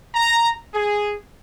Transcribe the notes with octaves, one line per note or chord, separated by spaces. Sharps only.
A#5
G#4